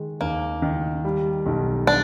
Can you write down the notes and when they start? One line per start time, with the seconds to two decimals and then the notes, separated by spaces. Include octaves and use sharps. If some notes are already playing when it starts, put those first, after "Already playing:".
Already playing: D#3 G#3
0.21 D#2 A#3
0.62 D#3
1.05 G3
1.46 B1
1.87 G3 D4